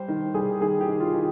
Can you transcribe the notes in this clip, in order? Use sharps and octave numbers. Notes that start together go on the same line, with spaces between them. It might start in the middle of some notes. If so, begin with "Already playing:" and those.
Already playing: G3 C5
D#3
G3 G#4
D#3 G#4
G4
D#3
F4
D#3